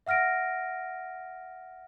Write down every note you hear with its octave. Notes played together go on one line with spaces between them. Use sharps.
E5 F#5 F6 A#6 D7